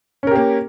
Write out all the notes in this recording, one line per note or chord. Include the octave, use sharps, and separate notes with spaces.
A#3 C#4 G4 A#4